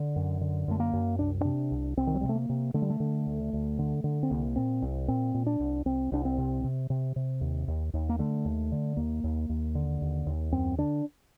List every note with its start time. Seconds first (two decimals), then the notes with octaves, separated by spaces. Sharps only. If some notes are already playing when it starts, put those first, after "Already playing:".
Already playing: D3
0.16 F#2
0.41 D3
0.68 F#2 A3
0.80 A#3
0.93 F#2
1.19 C2 D4
1.41 C3 D4
1.71 C2
1.97 C2 C4
2.07 D#3
2.15 F#3
2.21 G3
2.23 C3
2.29 A3
2.35 A#3
2.49 C3
2.74 D3 A3
2.82 G3
2.90 A3
3.00 D3
3.27 D2
3.53 D2
3.79 D3
4.04 D3
4.23 C4
4.30 C2 A#3
4.56 A#2 C4
4.82 C2
5.08 A#2 C4
5.34 A#2
5.46 D4
5.60 C2
5.85 C2 C4
6.12 C2 D4
6.25 C4
6.38 C3
6.64 C3
6.90 C3
7.16 C3
7.41 D#2
7.68 D#2
7.93 D#2
8.09 A#3
8.19 D3 A3
8.45 D#2
8.72 D3
8.97 D#2 A#3
9.24 D#2
9.49 D#2
9.75 D3
10.01 D#2
10.26 D#2
10.52 F#2 C4
10.78 D3 D4